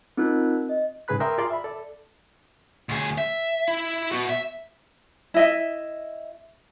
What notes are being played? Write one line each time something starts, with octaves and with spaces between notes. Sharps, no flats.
C4 D#4 F4 A#4 F#6
D#5
G#2 C#3 G#4 B4 B5 F#6
A#4 D5 E5 G5 C6 D#6
F4 G#4 D5 F5 A#5 C6
E5 B5
A4 D5
D2 G#4
E5
E4
B3 F#4
E5
E4 D#5 E5